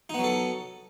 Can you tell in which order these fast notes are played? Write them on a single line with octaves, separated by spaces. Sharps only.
D#4 B3 F#3 A4